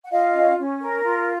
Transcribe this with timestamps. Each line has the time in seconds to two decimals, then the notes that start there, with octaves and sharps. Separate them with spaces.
0.05 F#5
0.11 F4 D#5 F5
0.34 C#4
0.58 C#4
0.81 A#4
1.04 F4